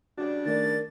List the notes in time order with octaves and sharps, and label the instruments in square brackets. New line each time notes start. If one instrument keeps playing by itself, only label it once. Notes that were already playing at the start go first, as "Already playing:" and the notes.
[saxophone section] C#3 G3 D4 [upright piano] F#4 D5
[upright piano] D#3 A3 D5 [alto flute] A#4 [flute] A6